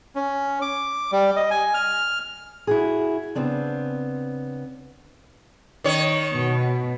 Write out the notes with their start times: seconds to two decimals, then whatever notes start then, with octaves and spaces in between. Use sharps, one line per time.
0.15 C#4
0.62 D6
1.12 G3
1.36 D#5
1.51 G#5
1.74 F6
2.67 E4 F#4 G#4
3.35 C#3 B3 C4 D4
5.84 D#3 C#5
6.36 B2